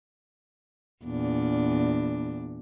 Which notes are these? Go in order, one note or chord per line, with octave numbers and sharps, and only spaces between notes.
E2 A#2 D4